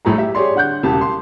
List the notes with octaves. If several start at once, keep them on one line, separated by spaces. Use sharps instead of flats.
A#1 A2 A3 G#4 A#5
G4 E5
G4 G#4 C#5 D5 C6
D3 F#5 F#6 G6
E1 C#3 G4 A5
C6